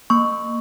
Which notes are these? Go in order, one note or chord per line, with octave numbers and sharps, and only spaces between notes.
A#3 C#6